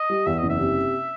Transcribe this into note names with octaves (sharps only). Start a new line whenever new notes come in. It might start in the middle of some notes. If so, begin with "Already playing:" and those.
Already playing: D#5
G3
E2 E5
F#1 D#5
E5
C3